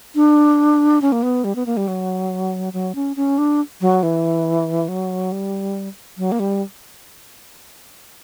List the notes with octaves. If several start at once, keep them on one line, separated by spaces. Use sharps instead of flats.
D4
C#4
A#3
B3
G3
B3
A#3
G3
F#3
F#3
C#4
C#4
D4
F#3
E3
F#3
G3
F#3
A#3
G3